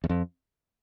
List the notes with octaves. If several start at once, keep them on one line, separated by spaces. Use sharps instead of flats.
E2
F2